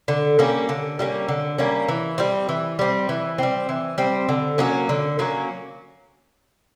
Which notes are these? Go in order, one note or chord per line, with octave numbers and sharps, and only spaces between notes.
D3
G3 A#3 C#4
D3
G3 A#3 C#4
D3
G3 A#3 C#4
E3
G3 C4
E3
G3 C4
E3
G3 C4
E3
G3 C4
D3
F#3 A#3 C#4
D3
F#3 A#3 C#4